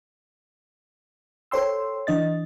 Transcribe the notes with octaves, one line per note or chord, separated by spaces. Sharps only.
A4 C5 C#5 G5 C6 E6
E3 D4 D#5 A6